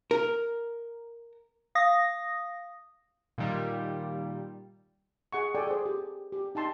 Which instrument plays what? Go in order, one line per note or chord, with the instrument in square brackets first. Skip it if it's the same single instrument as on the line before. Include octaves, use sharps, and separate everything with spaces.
[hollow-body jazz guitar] A#4
[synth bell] F5 D#6 A#6
[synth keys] A#2 D#3 G3
[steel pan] G#4 F#5 C#6
A4 D5 G5 G#5
G#4 C5
G4
G4
D#4 G5 A5 C6